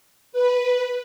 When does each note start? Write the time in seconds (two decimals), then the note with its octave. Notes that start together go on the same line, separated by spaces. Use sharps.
0.32 B4